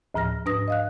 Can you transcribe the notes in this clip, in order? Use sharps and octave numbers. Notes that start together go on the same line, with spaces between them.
D2 A2 F3 F6 A#6
G#2 D4 B4 D#6 A#6
D#5 F5 F#6